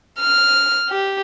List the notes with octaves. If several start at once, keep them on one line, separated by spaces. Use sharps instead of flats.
F6
G4